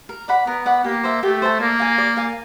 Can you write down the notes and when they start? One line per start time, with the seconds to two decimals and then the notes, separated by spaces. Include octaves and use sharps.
0.09 A#4
0.28 D5 F#5 B5
0.47 B3 A#4
0.66 D5 F#5 B5
0.84 A#3 G4
1.03 C5 E5 A5
1.23 A3 G4
1.42 C5 E5 A5
1.60 A#3 D5
1.79 F5 G#5
1.98 D5
2.17 F5 G#5